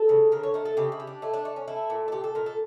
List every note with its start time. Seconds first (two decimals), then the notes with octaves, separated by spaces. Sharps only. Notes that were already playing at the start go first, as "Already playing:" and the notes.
Already playing: A4
0.09 C#3
0.32 D3 A#4
0.43 C#5
0.54 A3 A#4
0.65 A4
0.77 C#3 G4
0.92 E4
1.00 G3
1.07 D4
1.22 A3 E4
1.34 D4
1.45 A3
1.56 C#4
1.68 A3 E4
1.90 A#2
2.08 A4
2.12 A#2 G4
2.24 A4
2.35 A#2 A#4
2.46 A4